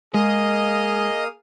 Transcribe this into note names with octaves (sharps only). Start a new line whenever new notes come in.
G#3 A#3 G#4 D#5 F5 D#6